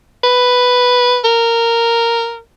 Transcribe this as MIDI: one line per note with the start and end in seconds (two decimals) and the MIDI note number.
0.24 1.18 71
1.24 2.39 70